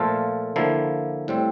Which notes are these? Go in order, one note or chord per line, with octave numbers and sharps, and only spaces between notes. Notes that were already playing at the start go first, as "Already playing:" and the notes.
Already playing: A#2 F3 A3 F4 A4
D3 F3 A#3 E4
A2 G3 C4